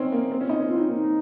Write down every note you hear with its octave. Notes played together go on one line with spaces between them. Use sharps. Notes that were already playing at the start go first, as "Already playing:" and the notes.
Already playing: C4 C#4 D#4
A#3
C4
C#4
D#4
C#4
C4 F4
D#4
A#3
D#4